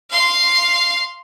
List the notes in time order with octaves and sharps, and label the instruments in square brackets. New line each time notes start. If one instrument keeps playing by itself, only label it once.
[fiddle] F5 C6